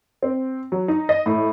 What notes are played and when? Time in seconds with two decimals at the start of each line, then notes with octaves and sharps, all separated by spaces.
0.23 C4
0.72 F#3
0.88 D#4
1.09 D#5
1.26 A2